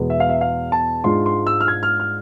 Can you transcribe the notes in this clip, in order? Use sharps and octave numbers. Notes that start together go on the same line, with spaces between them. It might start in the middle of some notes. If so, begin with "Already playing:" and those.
Already playing: E2 B2 G#3 B3
E5
F5
E5
F5
A5
G#2 G#3 D4 F4 C6
C6
E6
F6
G#6
F6
F6